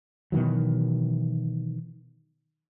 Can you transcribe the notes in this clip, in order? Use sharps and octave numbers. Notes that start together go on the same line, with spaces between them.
B2 D#3 E3 F#3